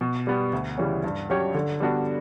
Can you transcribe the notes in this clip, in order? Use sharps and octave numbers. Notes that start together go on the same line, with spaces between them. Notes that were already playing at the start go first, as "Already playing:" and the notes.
B2
G3 B3
D2
C#3 E3 G3 C#4
G2
F#3 C#4 G4 C#5
D3
G3 B3 D4 F#4